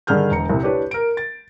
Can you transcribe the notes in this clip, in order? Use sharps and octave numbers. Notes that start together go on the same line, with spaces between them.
G2 D3 D#3 G#4 F6 G6
E1 A#5 C#7
C2 C3
D4 E4 G4 B4 C#5
A#4 D7
A6